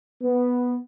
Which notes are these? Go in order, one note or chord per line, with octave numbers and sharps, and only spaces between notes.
B3